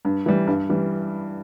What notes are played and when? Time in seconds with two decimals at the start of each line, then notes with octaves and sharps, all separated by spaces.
0.05 G2
0.26 E3 G3
0.47 G2
0.69 E3 G3